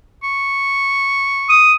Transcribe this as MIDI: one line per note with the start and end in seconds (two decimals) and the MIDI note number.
0.23 1.70 85
1.50 1.75 87